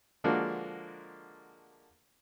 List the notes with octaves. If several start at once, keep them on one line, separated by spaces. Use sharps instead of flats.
D3 F3 G#3 A#3 D4 F#4